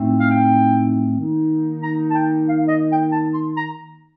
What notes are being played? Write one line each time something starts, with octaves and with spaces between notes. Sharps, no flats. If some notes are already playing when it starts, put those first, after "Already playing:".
Already playing: A2 A3 C4 D#4
F5
G5
D#3 A#3 D#4
A#5
A5
G5
F5
D#5
G5
A5
C6
A#5